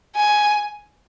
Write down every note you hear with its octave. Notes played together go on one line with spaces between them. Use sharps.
G#5